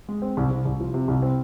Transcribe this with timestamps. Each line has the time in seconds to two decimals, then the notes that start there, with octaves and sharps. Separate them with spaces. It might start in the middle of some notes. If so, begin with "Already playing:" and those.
0.09 G#3
0.22 C4
0.37 C2
0.51 C2
0.65 C2
0.80 F3
0.94 C3
1.08 C2
1.22 C4